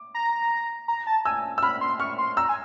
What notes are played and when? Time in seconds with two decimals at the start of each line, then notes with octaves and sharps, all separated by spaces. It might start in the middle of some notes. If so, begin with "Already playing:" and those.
Already playing: D6
0.15 A#5
0.88 A#5
1.07 A5
1.25 G#5 E6
1.58 E6
1.63 B5 F6
1.81 C6
2.00 C#6 F6
2.18 C6
2.37 A#5 E6
2.49 G#5